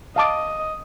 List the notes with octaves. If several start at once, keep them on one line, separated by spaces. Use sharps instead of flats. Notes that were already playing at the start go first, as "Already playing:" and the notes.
D#5 F5 A5 D6